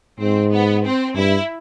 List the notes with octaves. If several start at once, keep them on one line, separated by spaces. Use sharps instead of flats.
G#2 C4
B3
C4
G2 E4